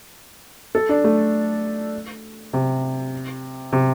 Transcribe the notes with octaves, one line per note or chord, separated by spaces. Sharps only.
A4
D4
A3
C3
C3